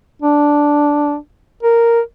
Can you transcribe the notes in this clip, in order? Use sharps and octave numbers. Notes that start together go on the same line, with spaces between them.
D4
A#4